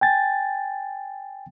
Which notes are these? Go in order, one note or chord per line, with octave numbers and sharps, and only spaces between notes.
G5 G#5 A6